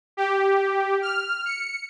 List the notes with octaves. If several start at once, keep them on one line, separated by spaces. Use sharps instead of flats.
G4
F6
C#7